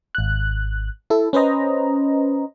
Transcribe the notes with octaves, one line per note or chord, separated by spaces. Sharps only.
G#1 F#6
E4 A4
C#4 B4 C5 D#5 A#5